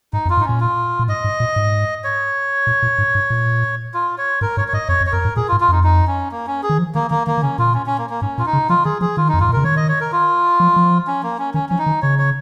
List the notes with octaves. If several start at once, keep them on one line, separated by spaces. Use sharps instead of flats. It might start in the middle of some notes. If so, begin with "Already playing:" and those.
G#2 D#4
F2
F4
G#2
D#4
A#2 C#4
F4
A#2
G#2 D#5
G#2
A#2
G#2
C#5
A#2
A#2
G#2
G#2
A#2
F4
C#5
G#2 A#4
G#2 C#5
C#5
G#2 D#5
F2 C#5
F2
C#5
F2 A#4
G#2
A#2 G#4
F4
G#2
F4
F2 D#4
D#4
C#4
A#3
C#4
G#4
D#3
F3
D#3 A#3
D#3 A#3
D#3 A#3
D#3
C#3 C#4
A#2 F4
C#4
C#4
A#3
A#3
G#2 C#4
A#2 F4
D#4
C#3
F3 F4
D#3 G#4
F3 G#4
D#3 F4
D#4
F2
G#2 F4
A#2
C#3 A#4
D#3 C#5
D#5
C#5
A#4
F4
F3
F3
C#4
A#3
C#4
D#3 C#4
F3 C#4
D#4
D#3
C#3 C#5
C#5